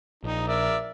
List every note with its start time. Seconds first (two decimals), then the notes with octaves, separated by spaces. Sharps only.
0.24 A#1 D#4
0.48 A#4 D5 E5